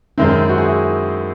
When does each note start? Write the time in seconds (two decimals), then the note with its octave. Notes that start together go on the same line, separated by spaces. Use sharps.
0.18 F#2 D#3 G#3 C4 E4
0.49 F#4
0.58 G#4
0.67 E4